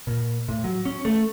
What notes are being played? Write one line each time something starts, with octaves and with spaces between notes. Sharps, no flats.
A#2
A2
F#3
C#4
A3